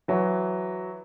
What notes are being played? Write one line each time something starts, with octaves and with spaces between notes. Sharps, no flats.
E3 F#3